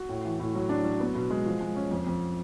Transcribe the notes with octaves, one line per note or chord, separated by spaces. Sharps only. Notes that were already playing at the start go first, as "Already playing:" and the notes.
Already playing: F#4
A2
E3
A2
F#3
D4
F#3
B3
B2
G#3
F3
G#3
C#4
F2
F2